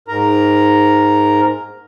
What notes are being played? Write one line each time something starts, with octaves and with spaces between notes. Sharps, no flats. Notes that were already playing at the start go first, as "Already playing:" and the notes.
G#2 A#4 A#5